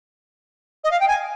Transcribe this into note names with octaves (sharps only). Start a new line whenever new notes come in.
D#5
F5
G5
G#5